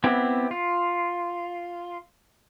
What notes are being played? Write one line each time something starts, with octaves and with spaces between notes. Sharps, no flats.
B3 C4 E4 G4
F4